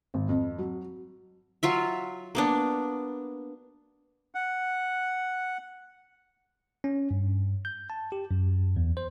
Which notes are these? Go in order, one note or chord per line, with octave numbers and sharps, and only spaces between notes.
G#1
F2
F#3
F#3 F4 E5
A#3 B3 D4
F#5
C#4
G2
G6
A5
G4
F#2
E2
C5